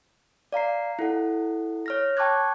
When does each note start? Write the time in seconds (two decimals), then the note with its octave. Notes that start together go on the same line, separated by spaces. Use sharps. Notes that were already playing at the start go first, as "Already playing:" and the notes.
0.52 D5 F5 A#5 C7
0.99 E4 A4 F#5
1.86 C#5 F6 A#6
2.17 G5 A5 C#6 D6 F#6 G#6